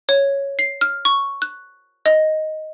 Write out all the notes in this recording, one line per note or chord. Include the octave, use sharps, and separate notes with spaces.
C#5
C7
F6
C#6
F#6
D#5